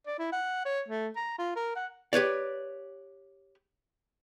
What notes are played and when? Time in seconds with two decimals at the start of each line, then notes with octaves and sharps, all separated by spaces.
0.07 D5
0.19 E4
0.32 F#5
0.65 C#5
0.88 A3
1.16 A#5
1.38 F4
1.56 A#4
1.76 F#5
2.13 G4 B4 C#5 D5